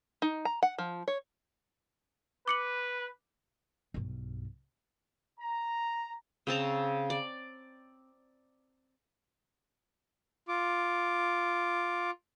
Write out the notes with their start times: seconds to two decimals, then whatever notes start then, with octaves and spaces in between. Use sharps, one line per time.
0.22 D#4
0.45 A#5
0.63 F#5
0.78 F3
1.08 C#5
2.48 B4 D6 C#7 F#7
3.94 B1 G2
5.40 A#5
6.47 C#3 C4 A5 A#5
7.10 D5
10.48 F4 D6